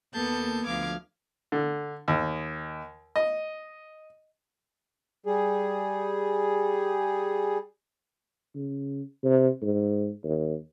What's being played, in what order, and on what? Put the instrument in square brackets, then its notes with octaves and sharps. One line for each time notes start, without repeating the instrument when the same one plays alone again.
[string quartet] D#2 A#3 B3 A4 A5 G6
D2 F3 F5 D6 G#6
[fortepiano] D3
D#2
D#5
[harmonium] G3 G#4
[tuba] C#3
C3
G#2
D#2